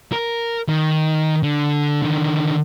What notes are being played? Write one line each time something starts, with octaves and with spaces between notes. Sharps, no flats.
A#4
D#3
D3
D3 D#3